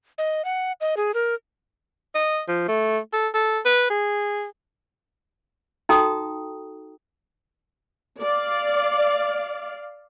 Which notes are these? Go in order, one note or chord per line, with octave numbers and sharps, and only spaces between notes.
D#5
F#5
D#5
G#4
A#4
D#5
F3
A3
A4
A4
B4
G#4
D#4 F#4 A4 G5 A#5 D#6
D5 F5